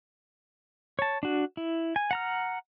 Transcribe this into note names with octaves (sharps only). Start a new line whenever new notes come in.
C#5 A5
D4 F#4
E4
G#5
F#5 A#5 F6